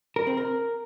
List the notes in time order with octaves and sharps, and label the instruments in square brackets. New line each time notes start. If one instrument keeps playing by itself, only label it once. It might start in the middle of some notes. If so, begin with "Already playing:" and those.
[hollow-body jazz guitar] A#4
C4
A#4